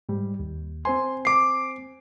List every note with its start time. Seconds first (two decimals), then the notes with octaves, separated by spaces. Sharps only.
0.09 G#2 G3
0.39 D#2
0.85 C4 C5 G#5 C6
1.25 D6 C7